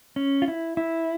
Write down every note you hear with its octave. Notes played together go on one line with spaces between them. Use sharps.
C#4
F4
E4
E4